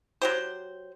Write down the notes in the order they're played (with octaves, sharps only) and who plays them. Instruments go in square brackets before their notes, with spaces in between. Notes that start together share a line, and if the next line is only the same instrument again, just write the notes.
[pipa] F#3 G4 C5